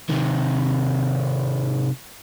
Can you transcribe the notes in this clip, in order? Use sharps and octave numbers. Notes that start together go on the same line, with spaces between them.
C3 D#3